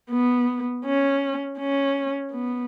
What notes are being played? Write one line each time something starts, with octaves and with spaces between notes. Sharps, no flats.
B3
C#4
C#4
B3